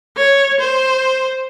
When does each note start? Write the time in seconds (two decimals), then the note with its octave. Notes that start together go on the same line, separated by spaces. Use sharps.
0.17 C#5
0.60 C5